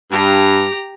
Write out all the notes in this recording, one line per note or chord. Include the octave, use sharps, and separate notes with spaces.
G2 G4 A#5